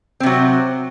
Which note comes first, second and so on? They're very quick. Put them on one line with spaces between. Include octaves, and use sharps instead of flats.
C4 C3 F#3